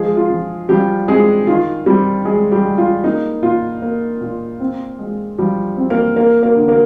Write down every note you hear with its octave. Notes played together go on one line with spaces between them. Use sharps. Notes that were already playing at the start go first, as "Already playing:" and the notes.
Already playing: F3 G#3 G#4
F4
F3
F3 G3 G4
G#3 C4 G#4
D#3 F4
G3 C4 G4
G#3 G#4
G3 G4
G#3
F4
A#3 D#4
A#2 F4
A#3
A#2
C4
G#3
F3 G3 G4
C4
A#3 A#4
A#3 A#4
A#3 A#4
D3
A#3 A#4